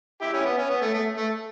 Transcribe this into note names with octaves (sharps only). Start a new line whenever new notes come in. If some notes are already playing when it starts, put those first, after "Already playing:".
E4 G4
C#4 E4
B3
C#4
B3
A3
A3
A3